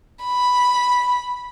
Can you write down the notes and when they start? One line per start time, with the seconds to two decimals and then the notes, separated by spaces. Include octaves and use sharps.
0.24 B5